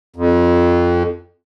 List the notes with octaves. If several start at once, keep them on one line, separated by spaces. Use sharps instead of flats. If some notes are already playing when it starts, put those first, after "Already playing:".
F2